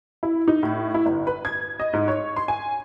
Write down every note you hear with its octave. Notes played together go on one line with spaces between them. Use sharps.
E4
D#4
A2
E4
G1
B4
G#6
D#5
G#2
C#5
C6
G#5